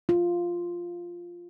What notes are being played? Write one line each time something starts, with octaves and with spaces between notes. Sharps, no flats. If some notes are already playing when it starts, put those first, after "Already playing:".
F4